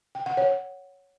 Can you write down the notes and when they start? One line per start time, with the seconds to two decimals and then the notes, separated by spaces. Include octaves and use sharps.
0.15 G5
0.26 F#5
0.37 C#5